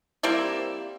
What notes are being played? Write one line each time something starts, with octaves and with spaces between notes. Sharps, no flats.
G3 A#3 C4 E4